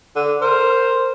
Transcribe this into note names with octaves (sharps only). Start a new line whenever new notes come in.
D3
A#4 C5